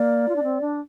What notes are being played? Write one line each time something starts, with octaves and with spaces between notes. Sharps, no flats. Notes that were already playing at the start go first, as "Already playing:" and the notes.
Already playing: A#3 D5
F4
D4
C4
D4